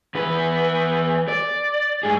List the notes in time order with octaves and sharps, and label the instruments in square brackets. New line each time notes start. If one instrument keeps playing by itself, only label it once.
[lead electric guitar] E2 B4
D5
G2 G#4